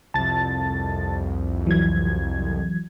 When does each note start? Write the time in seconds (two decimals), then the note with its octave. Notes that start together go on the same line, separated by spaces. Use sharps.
0.14 C2 F2 A5 A6
1.67 E3 F#3 G#6